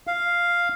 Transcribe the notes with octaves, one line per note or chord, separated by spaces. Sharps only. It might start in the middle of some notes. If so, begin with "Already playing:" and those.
F5